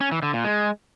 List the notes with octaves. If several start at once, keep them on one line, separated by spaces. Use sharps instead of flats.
C#4
E3
D3
A#2
G#3